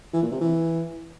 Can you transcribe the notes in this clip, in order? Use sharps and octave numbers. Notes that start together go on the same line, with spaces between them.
E3
A#2
C3
E3